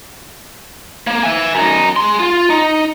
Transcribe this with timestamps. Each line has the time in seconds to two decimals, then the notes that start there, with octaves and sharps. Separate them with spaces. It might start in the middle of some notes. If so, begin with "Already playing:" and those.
1.07 A#3
1.23 E5 G#5
1.55 F#2 D#4
1.96 G#3 C6
2.19 F4
2.50 D#4